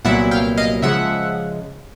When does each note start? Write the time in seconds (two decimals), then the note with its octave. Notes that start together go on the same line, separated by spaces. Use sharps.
0.05 C2 A#2 F#3 B3 E4 E5 F#5
0.31 F5 G5
0.57 D#5 F5
0.82 C#3 F3 G#3 E5 F#5